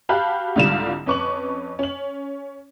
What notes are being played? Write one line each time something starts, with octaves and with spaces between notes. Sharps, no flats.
F#4 G4 F5 A5 B5 F#6
C2 G#2 D3 G3 F4 E7
F2 C#4 B4 C#6 D6 F#7
C#4 F#7